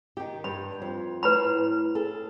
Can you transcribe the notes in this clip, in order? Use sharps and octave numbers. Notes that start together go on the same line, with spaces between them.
D#3 G4
G2 B5
F2
A2 B4 A#5 B5
G#4 A4